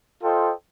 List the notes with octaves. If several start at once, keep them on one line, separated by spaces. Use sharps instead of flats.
F4 A4 C5 D#5 G5